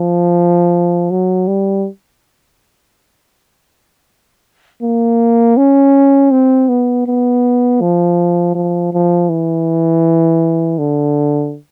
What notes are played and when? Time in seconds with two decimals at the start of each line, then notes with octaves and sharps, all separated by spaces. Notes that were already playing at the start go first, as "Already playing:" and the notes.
Already playing: F3
1.11 F#3
1.47 G3
4.83 A#3
5.57 C#4
6.31 C4
6.68 B3
7.07 B3
7.81 F3
8.55 F3
8.93 F3
9.29 E3
10.78 D3